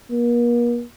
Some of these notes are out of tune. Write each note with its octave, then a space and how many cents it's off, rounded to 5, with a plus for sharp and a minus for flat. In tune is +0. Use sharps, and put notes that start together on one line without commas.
A#3 +45